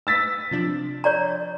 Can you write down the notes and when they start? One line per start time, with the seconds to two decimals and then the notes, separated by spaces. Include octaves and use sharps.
0.07 E6 A6 B6
0.51 C3 F3 D4
1.04 C#5 D5 A#5